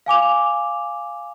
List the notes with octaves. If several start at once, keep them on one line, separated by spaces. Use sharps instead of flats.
F5 G#5 D6 F7